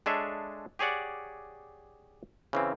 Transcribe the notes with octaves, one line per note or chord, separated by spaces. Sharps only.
G#3 D4 G#4 A4 C#5 E5
G4 G#4 C#5 D5 F#5
C#3 E3 C4